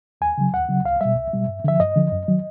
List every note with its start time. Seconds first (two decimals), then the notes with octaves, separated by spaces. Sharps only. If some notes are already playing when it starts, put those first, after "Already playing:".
0.21 D#2 G#5
0.38 C#3 F#3
0.54 D#2 F#5
0.69 C#3 F#3
0.85 C2 F5
1.01 B2 G3 E5
1.16 C2
1.33 B2 G3
1.48 G2
1.64 D3 F3 E5
1.80 G2 D#5
1.96 D3 F3
2.12 F#2
2.28 D#3 F#3